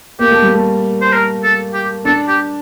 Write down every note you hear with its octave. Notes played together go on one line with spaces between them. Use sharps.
A#3 G4
A3
G3
A3
C5
A#4
A4
G4
D4 A4
G4